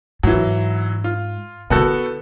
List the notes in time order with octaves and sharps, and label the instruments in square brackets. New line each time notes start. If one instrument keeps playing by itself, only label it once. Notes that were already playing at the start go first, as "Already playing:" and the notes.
[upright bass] G#2 [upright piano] E3 F#3
[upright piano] F4
[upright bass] D3 E4 [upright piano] B3 F#4 A4